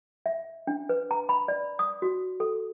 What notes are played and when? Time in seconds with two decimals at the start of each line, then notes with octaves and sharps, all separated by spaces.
0.26 E5
0.67 D4
0.89 B4
1.11 A#5
1.29 B5
1.48 D5
1.79 D#6
2.02 F#4
2.40 A4